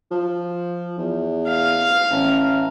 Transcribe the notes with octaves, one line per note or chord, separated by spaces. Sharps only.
F3
E2
F5
A1